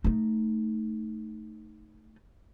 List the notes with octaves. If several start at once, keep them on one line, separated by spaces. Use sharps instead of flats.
A3 D#4